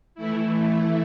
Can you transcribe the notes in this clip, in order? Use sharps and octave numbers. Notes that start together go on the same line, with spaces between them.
E3 A3 E4